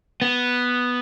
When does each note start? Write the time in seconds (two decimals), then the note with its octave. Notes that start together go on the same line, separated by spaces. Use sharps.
0.22 B3